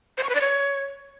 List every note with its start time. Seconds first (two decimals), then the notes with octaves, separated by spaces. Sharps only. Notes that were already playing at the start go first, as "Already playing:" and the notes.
0.18 C5
0.23 C#6
0.29 B4
0.35 D5
0.41 C#5